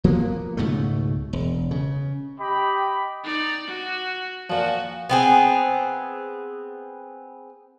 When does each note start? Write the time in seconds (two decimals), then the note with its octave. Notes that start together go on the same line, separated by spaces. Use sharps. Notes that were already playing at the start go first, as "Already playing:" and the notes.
0.04 F3 A#3 B3
0.57 C#2 G#2 B2 A3
1.33 E1
1.71 C#3
2.40 G4 D#5 G5 B5
3.23 D#4 D5
3.67 F#4
4.50 A#2 F3 F#4
5.09 B3 C4 G#4